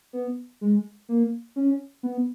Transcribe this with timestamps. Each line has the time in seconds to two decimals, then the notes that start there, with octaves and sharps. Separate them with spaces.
0.13 B3
0.61 G#3
1.09 A#3
1.56 C#4
2.03 B3